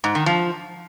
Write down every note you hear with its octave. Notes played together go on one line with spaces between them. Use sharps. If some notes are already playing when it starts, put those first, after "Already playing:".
G#2
D#3
F3